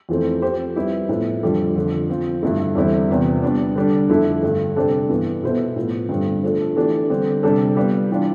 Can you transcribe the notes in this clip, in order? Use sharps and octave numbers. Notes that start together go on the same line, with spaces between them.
F2 E3 A3 C4
F3 C4 G4 C5
G3 C4 E4 G4 B4
A2 F3 B3 E4
F2 D3 G3 D4 A4
F2 D3 F3
F3 C4 F4
G2 D3 A3 E4
E2 D3 G3 C4 E4
E2 C3 F3 B3
G3 B3 D4
D3 G3 D4
F2 D3 A3 E4 A4
G2 D3 A3
C3 G3 D4 A4 C5
G2 E3 B3
B2 B3 E4 A4 C5
A2 F3 B3
G2 D3 G3 C4
F3 A3 D4 A4
E3 A3 D4 G4
D3 G3 C4
C3 G3 D4 A4
G3 B3 F4
E3 G3 D4 F4